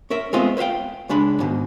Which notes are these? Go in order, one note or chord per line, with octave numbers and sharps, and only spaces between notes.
C#4 A#4 E5
G#3 A3 B3 C4 F4 D#5
B4 C5 E5 F5 G5
C#2 G#3 D4 B5
G#2 B2 D#3